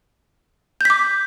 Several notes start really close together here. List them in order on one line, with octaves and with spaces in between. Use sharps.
G6 B6 D6